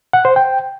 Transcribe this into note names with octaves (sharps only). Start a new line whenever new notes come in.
F#5
C5
G5